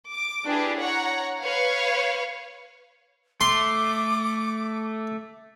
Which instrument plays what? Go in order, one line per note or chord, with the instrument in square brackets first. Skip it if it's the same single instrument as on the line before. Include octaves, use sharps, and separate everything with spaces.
[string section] D6
D4 E4 G4 G#4 B4
C#5 F#5 A#5
B4 C#5 F5
[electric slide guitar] A3 [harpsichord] C6 [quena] D6